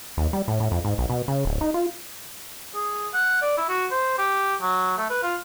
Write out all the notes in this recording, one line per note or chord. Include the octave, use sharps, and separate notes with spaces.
D#2
G3
A2
A2
F2
G#2
B1
B2
C#3
D1
D#4
F4
G#4
F#5
D5
E4
F#4
C5
G4
F#3
A3
B4
F4